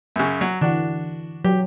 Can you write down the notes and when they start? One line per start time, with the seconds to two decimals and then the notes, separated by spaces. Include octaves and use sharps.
0.16 F#2 C#3
0.41 F#3
0.61 D3 E3 D4 F#4
1.44 F#3 G4